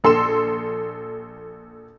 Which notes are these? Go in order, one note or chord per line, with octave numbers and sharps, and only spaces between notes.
A#1 A4 C6 E6 E7